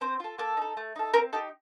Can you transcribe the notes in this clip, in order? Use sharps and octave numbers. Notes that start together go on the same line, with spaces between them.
C4 C5
F4 A4
A#3 A4
D#4 A4
A3
D#4 A4
C4 A#4
D#4 G4 A4